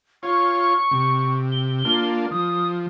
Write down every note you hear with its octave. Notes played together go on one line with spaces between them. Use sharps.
F4 C#5 C#6
C3
G7
A#3 D4 F4
F3 D#6